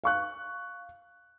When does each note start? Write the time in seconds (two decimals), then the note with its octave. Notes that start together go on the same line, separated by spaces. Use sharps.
0.04 F5 C#6 F#6